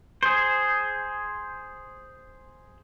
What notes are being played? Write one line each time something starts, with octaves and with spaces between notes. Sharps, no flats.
G#4 C5